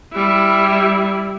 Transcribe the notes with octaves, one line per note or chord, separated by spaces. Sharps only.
G3 E4